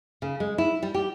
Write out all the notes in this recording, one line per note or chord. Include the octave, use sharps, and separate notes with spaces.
C#3
G#3
E4
G3
G4